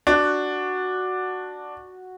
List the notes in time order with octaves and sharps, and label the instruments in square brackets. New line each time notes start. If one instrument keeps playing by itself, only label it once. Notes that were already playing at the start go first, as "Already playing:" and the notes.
[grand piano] D4 [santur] F#4